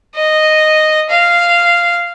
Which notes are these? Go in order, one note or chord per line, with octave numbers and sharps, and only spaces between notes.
D#5
F5